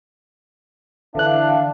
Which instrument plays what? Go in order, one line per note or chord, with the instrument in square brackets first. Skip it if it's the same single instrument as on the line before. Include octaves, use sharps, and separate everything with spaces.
[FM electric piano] D3 E3 F#6 [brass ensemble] D4 E5 F5